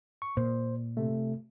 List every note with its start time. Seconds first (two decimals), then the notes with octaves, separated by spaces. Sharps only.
0.22 C#6
0.37 A#2 C5
0.97 C3 A3